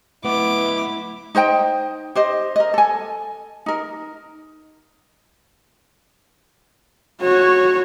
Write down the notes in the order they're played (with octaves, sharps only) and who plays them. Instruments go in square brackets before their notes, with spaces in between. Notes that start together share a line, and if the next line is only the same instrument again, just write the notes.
[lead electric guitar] A3 D#5 [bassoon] B3 [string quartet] E4 [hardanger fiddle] D6
[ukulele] D#4 C5 D#5 G5
G4 C5 D#5
A#4 D#5
A4 G#5
D#4 A#4
[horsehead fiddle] F#4 C#5